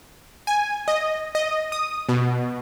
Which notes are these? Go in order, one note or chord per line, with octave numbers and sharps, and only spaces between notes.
G#5
D#5
D#5
D#6
B2